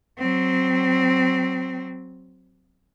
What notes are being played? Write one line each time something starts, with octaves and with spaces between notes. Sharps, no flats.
F#3 C4